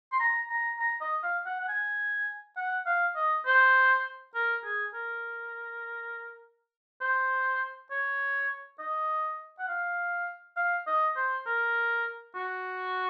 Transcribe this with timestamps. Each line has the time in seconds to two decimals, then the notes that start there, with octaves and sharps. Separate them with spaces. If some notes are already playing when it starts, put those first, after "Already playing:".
0.12 C6
0.20 A#5
0.50 A#5
0.79 A#5
1.01 D#5
1.23 F5
1.46 F#5
1.61 F#5
1.68 G#5
2.57 F#5
2.86 F5
3.16 D#5
3.46 C5
4.35 A#4
4.65 G#4
4.94 A#4
7.01 C5
7.91 C#5
8.79 D#5
9.59 F#5
9.68 F5
10.57 F5
10.87 D#5
11.16 C5
11.46 A#4
12.35 F#4